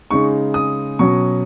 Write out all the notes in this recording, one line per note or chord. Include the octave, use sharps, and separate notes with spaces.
C#3 G#3 D#4 C#6
D#6
B2 F#3 C#4 C#6